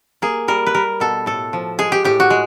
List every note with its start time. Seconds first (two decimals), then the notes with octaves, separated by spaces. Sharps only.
0.22 A#3 G#4
0.48 G3 A#4
0.66 B4
0.74 G3 A#4
1.00 B2 A4
1.26 A2 A4
1.53 F3
1.79 G#3 G#4
1.92 G4
2.04 A2 G4
2.20 F#4
2.30 G#3